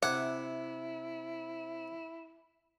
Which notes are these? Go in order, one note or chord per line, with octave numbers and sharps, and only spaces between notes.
C3 E4 F#5 G#5 D6